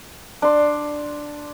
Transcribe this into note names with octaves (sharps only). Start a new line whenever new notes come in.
D4 C6